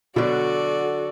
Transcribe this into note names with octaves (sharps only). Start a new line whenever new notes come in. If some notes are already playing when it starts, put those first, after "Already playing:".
B2 D3 F#3 F#4 A4 D5